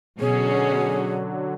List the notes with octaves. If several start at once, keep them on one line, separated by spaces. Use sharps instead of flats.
B2 D3 F#3 C#4 F#4 G#4